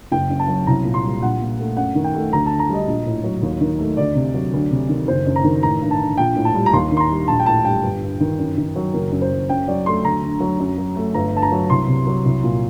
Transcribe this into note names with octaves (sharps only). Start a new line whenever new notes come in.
F#1 G5
F#2
A5
F#3
C2 A#5
A#2
C6
G3
A#1 F#5
A#2
A3
F#2 F#5
D#3
G5
A3
D2 A#5
D3 A5
A#5
G3 D#5
A#1
A2
F#3
D#2
D#3
A3
D2 D5
C3
F#3
D2
C3
D#3
F#1 C5
F#2
A#5
D#3
A1 A#5
G2
A5
D3
A#1 G5
A2
A5
G3
A#5
D#2 C6
D#3
C6
A#5
G3
A#1 A5
G5
A2 A5
G3 G5
G1
G2
D#3
F#2
D#3
F#3
F#1 A#4
F#2
C5
F#3
F#2 G5
F#3 D5
A3 C6
D2 A#5
D3
F#3
F#2
F#3
A3
G1 A#5
G2 A5
A#5
F#3
C2 C6
C3
F#3
C2
A#2